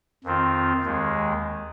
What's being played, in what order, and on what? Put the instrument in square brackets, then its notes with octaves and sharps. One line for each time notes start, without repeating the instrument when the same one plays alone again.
[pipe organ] F2 D#3 C4 F4
D#2 D#3 G#3